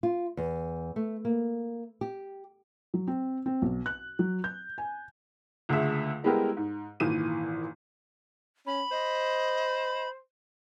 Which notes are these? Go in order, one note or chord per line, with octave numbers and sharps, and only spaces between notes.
F4
E2
A3
A#3
G4
F#3
C4
C4
B1
F#6
F#3
G6
G#5
C#2 D3 A3 G#4 E5
G3 G#3 B3 E4 G4 A#4
G#2
G#1 A#2 E3 D#7
C#4 B5
C5 D#5